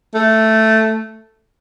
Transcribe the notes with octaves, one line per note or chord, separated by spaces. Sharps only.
A3